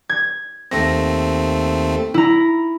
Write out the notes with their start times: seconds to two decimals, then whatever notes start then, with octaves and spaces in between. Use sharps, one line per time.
0.09 G#6
0.71 D#2 A3 C4 A#6
2.14 E4 A#5